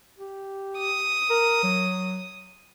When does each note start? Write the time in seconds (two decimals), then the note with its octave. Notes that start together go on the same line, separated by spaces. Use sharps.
0.18 G4
0.78 D#6
1.30 A#4
1.63 F#3